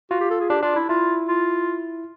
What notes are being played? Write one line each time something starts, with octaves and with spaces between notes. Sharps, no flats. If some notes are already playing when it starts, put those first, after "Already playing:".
F4 F#4
G4
A4
G#4
D4 G4
D4 F4
E4
E4 F4
F4